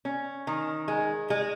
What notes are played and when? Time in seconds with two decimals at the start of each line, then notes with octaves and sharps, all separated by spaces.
0.05 C#4
0.47 D#3
0.88 G#3
1.30 G#3